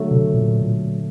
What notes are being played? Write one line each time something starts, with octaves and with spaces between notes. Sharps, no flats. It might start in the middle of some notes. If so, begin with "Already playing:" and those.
Already playing: D3 F#3 A3
C3
A#2